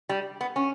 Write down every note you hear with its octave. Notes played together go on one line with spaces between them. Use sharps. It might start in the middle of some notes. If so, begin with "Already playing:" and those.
G3
B3
C#4